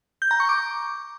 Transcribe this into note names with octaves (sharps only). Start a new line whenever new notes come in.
G6
A#5
C#6
D6